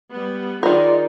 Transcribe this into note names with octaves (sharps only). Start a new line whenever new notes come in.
G3 B3
D#3 D#4 F4 G#4 A#4 D5